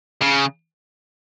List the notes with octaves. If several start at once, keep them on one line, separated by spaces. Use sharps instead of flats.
C#3